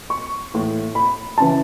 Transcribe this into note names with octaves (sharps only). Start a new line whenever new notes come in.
C#6
A2 E3
B5
C#3 E3 A5